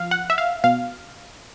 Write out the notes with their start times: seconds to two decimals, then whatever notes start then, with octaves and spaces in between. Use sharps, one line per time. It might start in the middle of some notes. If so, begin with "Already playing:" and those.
Already playing: F3 F5
0.11 F#5
0.30 E5
0.38 F5
0.64 B2 F5